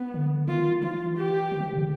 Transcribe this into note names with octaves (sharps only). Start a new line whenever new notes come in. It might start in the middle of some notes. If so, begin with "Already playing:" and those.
Already playing: B3
D3
D#3 F4
E3 F4
G4
D#3
E3
C3
C#3